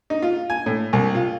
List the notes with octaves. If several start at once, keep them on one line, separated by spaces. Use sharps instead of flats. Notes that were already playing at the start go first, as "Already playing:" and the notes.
D#4
F4
G#5
A2
C2
F4